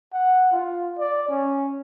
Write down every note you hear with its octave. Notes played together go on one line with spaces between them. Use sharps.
F#5
F4
D5
C#4